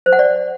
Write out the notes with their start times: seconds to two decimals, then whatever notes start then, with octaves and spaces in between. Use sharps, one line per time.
0.06 C5
0.13 F#5
0.19 D5